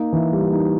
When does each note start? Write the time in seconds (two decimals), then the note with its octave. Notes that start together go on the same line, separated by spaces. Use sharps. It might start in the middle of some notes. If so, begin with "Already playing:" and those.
Already playing: A#3 D#4
0.13 E3
0.33 G3
0.52 D#4